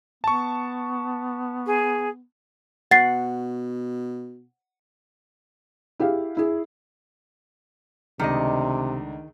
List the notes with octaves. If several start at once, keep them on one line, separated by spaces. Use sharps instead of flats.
B3 A5 C#6
G#4
B2 F#5 A6 C7
E4 G4 G#4 F5
E4 G#4
C#2 C3 D#3 A3 D4 D5 D#5